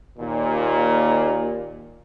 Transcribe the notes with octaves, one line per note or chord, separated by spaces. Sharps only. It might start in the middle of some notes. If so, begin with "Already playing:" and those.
D#2 A#2